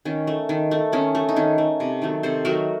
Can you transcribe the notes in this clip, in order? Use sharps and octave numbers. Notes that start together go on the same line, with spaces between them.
D#3 C#4
A3
D#3
A3
D#3 C#4
A3
D#4
D#3 C#4
A3
C3
D#3 F#3 A3
C3 A4 C5
D#3 F#3 A3 F#4 A#4